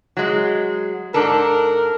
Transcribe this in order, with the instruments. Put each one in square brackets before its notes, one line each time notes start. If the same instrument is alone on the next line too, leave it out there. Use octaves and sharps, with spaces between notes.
[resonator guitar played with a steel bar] F#3 G#3
[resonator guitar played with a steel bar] G#2 D4 A4 [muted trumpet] A#4